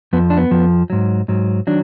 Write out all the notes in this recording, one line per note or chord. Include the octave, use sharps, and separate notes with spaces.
F2 F3 B3
D4
B3
F2 F3
G#2 F#3
G#2 F#3
D#3 F#3 D4